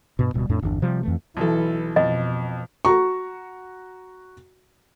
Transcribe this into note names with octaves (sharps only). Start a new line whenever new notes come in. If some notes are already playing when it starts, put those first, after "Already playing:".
G2 B2
D1 B2 G3
F2 A2 D4
G1 E2 D4
C3 F3 G3
F2 E3 A3
B1 E3 A4
F2 B2 D#5
F#4 A#5 C#6